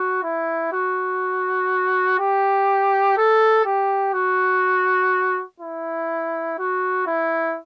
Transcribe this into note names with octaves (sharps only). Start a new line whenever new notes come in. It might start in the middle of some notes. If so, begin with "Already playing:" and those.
Already playing: F#4
E4
F#4
G4
A4
G4
F#4
E4
F#4
E4